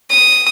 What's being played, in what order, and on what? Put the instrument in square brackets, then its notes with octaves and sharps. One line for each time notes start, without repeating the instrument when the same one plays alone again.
[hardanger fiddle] D#6